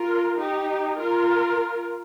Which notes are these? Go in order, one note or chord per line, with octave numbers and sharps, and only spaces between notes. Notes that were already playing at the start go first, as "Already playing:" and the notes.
Already playing: F4 A#4
D#4 G4
F4 A#4